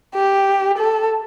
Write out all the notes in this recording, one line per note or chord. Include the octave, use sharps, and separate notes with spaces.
G4
A4